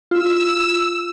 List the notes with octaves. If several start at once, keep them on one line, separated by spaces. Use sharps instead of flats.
F4 E6